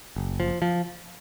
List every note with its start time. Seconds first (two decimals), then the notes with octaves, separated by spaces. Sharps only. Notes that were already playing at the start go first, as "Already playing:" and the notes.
0.16 F#1
0.40 F3
0.62 F3